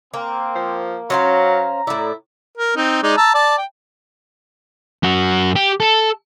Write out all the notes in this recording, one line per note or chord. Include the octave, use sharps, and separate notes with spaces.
A#3 C4
F3
F#3 C#4 C5 F5 A#5
A2 E4 D5
A#4
C4 D#4
G#3 D#4 D5
A5 A#5 E6
D5 A5
G5
F#2 F#4
G4
A4